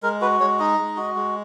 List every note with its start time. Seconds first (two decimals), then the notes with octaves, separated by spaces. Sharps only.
0.03 G#3 A#4
0.21 F#4 B4
0.40 G#3 C#5
0.59 D#4 D#5
0.78 G#3
0.97 F#4
1.15 G#3